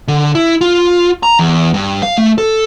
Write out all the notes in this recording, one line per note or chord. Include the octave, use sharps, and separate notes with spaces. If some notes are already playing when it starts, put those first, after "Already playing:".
D3
E4
F4
A#5
E2
G2
F5
A3
A4